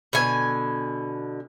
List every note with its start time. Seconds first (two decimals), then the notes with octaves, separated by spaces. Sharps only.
0.13 B2 D3 G#5